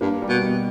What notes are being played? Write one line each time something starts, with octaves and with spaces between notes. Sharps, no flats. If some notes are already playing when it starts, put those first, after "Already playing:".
G2 A#3
G3
B2
B2